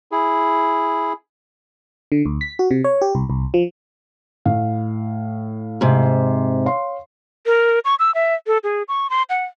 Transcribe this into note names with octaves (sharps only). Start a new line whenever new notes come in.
E4 G#4
D3
D2
B6
F#4
C3
C#5
G4
C2
C2
F3
A2 F5
G#2 C3
C#5 F5 C6
A#4
C#6
E6
E5
A4
G#4
C#6
C6
F#5